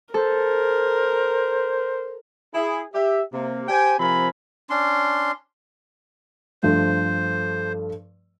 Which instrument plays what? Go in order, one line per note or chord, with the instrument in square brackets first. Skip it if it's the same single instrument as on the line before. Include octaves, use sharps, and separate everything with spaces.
[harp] A4 [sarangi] A#4 [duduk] C5
[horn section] E4 G#4
G4 E5
C3 A#3
G4 C5 G5 G#5
C3 F3 C4 A#4 G#5 B5
[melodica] C#4 D4 C6
[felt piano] G2 F3 A3 [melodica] C5